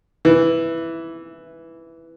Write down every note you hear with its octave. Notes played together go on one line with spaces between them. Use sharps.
E3